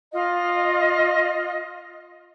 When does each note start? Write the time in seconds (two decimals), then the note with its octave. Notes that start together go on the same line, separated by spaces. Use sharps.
0.12 F4 D#5 F5